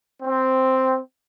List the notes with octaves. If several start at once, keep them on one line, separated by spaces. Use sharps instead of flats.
C4